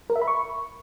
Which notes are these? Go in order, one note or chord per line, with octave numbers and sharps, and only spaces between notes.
A#4
E5
B5
C#6